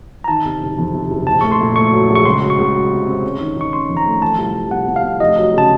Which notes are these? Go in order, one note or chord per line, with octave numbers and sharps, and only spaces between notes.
A#5
D#3 A5
C3
F#1
F2
C3
F#1
A#1 A5
A3 C#6
C6
A#2
A3 C#6
F#3
A#1
C#6
C#2 C6
F#3
C#6
C#2
F#3
C3
C4
C#4
D#3
D#3 C#6
C#4 C6
F2
A#5
A3
F3 A5
C2
C2
C3 F#5
C3
F5
C3
F1 D#5
F#3
C#3 A5